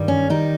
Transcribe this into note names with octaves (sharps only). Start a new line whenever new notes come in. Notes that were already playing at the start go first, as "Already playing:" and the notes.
Already playing: G2 D#3 G3
C#4
D#3 G3 D#4